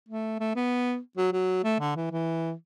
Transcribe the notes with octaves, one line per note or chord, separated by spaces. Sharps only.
A3
A3
B3
F#3
F#3
A3
D3
E3
E3